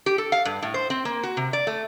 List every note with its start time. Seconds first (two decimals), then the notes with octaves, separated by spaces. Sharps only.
0.06 G4
0.18 A4
0.32 F5
0.45 G2
0.62 A2
0.74 C5
0.90 C4
1.05 A#3
1.23 F#4
1.37 C3
1.53 D5
1.67 A3